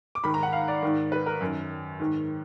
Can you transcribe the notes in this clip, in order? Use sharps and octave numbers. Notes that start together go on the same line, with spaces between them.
D6
G#2 D#3 B5
A#5
F#5
F5
D5
G#2 D#3
B4
A#4
F#2 D#3
G#2 D#3